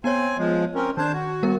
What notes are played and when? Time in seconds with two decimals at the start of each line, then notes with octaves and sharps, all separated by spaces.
0.04 B3 C4 C#5 G#5
0.38 F3 G#3
0.75 C4 C#4 A#4
0.97 D#3 D4 C5 A5 G#6
1.13 F#4
1.43 G3 B3 A#4